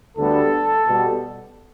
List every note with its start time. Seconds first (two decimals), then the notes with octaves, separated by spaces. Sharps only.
0.17 D2 D3 G3 B3 A4
0.84 B2 G3 B3